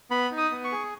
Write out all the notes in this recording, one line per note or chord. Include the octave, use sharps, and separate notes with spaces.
B3 B5
D#4
D#6
B3
C#6
G#4